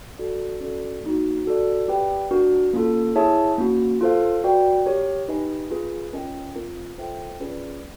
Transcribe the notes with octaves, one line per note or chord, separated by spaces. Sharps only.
F#4 A4 D5
C#4 F#4 A4 D5
A#3 D#4 F#4
F#4 A4 D5
G4 B4 D5 G5
D4 F#4 A#4 D5
A#3 C#4 F4 A4
E4 G#4 C#5 E5 A5
A#3 C#4 F#4
F4 A4 C5 F5
F#4 B4 D5 G5
G4 A#4 C#5
D#4 G4 B4 D#5 G#5
C4 F4 G#4 B4
C#4 F4 A#4 D#5 G5
C4 F4 A#4
F4 A4 C5 E5 G5
C#4 F4 G#4 B4 D5